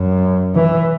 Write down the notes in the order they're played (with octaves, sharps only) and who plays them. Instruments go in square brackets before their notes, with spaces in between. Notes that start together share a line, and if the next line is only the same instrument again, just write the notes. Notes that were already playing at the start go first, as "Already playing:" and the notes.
Already playing: [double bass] F#2
E3